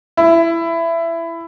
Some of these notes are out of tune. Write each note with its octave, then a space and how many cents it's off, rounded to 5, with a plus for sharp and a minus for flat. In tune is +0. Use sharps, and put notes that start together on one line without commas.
E4 +15